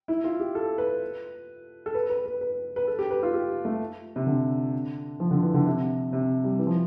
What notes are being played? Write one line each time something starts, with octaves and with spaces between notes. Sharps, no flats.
E4
F4
G4
A4
B4
A4
B4
B4
B4
B4
B4
A4
G4
B4
F4
G4
A3
C3
D3
F3
D3
E3
D3
C3
C3
G3
E3
F3